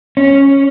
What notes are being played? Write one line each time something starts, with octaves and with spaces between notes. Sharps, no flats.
C#4